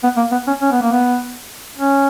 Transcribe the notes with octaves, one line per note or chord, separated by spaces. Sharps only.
B3
A#3
B3
C#4
C#4
B3
A#3
B3
C#4